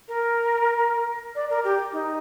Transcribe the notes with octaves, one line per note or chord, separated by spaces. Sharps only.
A#4
D5
A#4
G4
D#4